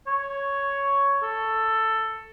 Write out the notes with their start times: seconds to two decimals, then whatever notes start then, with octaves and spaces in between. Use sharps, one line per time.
0.07 C#5
1.23 A4